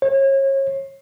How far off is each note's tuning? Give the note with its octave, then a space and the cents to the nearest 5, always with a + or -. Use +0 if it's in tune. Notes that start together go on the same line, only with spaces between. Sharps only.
C#5 -35